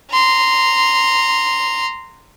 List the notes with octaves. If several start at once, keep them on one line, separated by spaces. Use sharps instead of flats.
A#5 C6